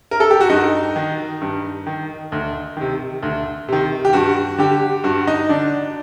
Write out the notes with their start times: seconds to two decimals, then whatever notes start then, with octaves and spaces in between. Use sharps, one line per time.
0.11 A#4
0.20 A4
0.31 G4
0.40 F#4
0.49 G2 D#4
0.96 D#3
1.41 G2
1.87 D#3
2.32 D2
2.77 C3 D#3
3.23 D2
3.68 C3 D#3
4.05 G4
4.13 G2 F#4
4.58 D3 G4
5.04 G2 F#4
5.27 D#4
5.49 D3 D4